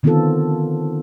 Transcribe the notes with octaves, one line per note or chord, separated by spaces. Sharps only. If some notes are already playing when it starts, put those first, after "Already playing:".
D3 D#3 B3 C4 F4 A4